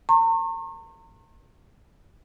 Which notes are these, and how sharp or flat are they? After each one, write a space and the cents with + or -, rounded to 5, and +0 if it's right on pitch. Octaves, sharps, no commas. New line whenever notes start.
A#5 -40 C#6 -45